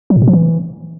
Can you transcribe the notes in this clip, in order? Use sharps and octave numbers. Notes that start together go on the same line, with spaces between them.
F#3
A2
B2
F3
E3